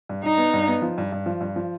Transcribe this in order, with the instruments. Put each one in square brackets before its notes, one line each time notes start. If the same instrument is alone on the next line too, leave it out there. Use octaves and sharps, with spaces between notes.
[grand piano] G2
[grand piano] G2 [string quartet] D#4
[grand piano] B3
G2
B3
F3
G2
G2
F3
G2
F3